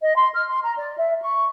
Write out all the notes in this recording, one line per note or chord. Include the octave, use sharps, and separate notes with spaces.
D#5
C6
F6
C6
A#5
D5
E5
C#6